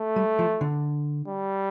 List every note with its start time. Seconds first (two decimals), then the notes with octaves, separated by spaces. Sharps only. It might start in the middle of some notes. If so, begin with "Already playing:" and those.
Already playing: A3
0.16 G3
0.39 F3
0.61 D3
1.27 G3